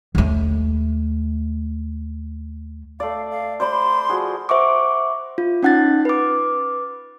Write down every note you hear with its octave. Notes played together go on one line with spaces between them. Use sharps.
D#2 A3
A3 D5 F5
F5
C5 D5 B5 C6
F3 F#4 G#4
C5 E5 F#5 C#6 D6
F4
C#4 D#4 F#5 F#6 A6
B4 D6